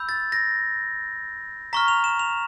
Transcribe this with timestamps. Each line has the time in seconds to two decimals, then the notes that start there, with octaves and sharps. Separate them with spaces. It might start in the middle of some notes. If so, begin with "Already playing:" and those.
Already playing: B5 E6 G6
0.09 A6
0.32 A#6
1.73 A#5 C#6 F6 B6
1.88 F7
2.04 E7
2.19 F7